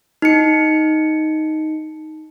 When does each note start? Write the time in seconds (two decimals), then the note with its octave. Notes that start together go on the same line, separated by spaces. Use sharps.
0.22 D#4 C#7